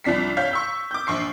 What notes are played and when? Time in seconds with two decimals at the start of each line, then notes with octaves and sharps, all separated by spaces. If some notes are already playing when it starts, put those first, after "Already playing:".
0.04 C2 F3 D4 B6 C7
0.37 C#5 F5 G6 B6
0.51 C#6 E6 G6
0.91 D6 G6
1.07 A#1 C#6 C7